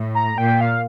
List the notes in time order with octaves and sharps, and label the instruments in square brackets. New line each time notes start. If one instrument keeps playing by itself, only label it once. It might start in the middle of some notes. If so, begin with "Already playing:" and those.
Already playing: [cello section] A2
[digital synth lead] A#5
[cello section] A#2 [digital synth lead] G5
[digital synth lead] F5